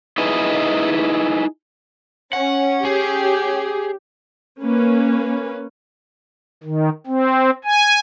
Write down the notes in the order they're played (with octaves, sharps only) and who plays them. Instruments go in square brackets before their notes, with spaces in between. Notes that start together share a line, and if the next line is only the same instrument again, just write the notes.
[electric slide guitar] D#4 E4 G#4 B4 D#5
[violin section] C#4 [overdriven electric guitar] F#5
[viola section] G4 [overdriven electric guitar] G#4
[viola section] A#3 C#4 B4
[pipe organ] D#3
C4
G#5